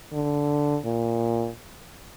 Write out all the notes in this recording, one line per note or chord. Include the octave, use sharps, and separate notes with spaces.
D3
A#2